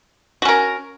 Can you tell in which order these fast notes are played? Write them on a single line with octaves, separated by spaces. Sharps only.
F#4 C#4 A#4